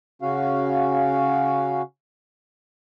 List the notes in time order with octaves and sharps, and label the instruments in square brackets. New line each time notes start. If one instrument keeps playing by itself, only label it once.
[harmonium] C#3 C#4 F#4 F5